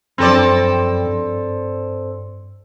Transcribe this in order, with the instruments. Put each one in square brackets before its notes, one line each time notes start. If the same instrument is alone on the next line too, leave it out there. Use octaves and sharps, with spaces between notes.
[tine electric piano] F#2 F3 B5 [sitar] C4 A4 D5
[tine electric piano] G2